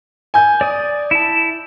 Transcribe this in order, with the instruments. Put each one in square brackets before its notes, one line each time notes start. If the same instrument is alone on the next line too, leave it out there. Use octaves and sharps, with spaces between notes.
[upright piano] G#5 G6
[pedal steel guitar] D5 D#6
E4 A5